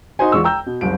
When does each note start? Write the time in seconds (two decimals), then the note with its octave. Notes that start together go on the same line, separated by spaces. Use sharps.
0.19 D#4 F#4 C5 G#5
0.32 E2 G#3 F4 C#6 E6
0.44 G5 A#5 E6 G6
0.67 B2
0.81 F#1 C2 D7